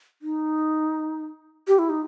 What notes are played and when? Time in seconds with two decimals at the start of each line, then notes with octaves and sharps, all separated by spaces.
0.22 D#4
1.68 G4
1.79 E4
1.89 D#4